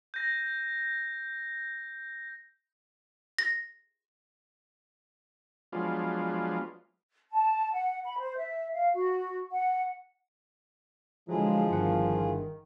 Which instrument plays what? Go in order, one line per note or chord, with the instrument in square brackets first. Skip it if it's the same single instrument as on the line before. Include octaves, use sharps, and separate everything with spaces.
[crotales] G6 A#6
[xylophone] A#6
[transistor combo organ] F3 F#3 G#3 B3 D4 F4
[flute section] A5
F#5
B5
C5
E5
F5
F#4
F#5
[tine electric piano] D3 F#3 [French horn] F3 [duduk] G#3 [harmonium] E4 F4 G#4
[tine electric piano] G1 G2 F#5 [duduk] D#3